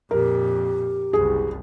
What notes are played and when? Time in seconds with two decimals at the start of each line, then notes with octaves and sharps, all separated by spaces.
0.11 F2 A#2 G4 A#4
1.13 F#1 C2 G#4